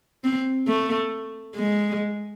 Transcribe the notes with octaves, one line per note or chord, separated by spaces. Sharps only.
C4
A3
G#3